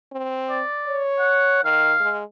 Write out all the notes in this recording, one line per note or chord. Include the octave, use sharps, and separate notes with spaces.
C4
D5
C#5
F#5
D#3 F5
G#3